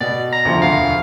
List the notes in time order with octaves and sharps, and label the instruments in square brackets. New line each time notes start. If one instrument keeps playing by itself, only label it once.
[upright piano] B2 [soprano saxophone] D5
[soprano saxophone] A#5
[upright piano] D2 F3
[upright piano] E1 D2 [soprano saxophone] F5